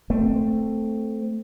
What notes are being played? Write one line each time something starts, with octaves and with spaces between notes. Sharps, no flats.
A3 C4